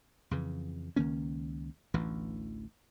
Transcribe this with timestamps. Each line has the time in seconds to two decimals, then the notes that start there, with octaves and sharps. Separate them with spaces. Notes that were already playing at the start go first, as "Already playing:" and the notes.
0.31 F2 C#3 E3
0.96 C#2 D#3 A#3 C#4
1.94 A1 D2 E3